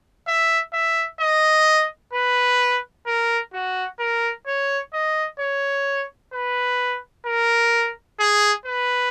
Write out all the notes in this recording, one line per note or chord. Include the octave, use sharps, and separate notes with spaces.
E5
E5
D#5
B4
A#4
F#4
A#4
C#5
D#5
C#5
B4
A#4
G#4
B4